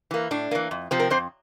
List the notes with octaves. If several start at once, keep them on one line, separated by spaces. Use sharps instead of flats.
E3 A#3
A2 D4
E3 A#3
F2
C3 F3 C4
A#4
F2 C4 C5